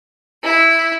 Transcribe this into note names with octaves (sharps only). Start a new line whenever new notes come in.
E4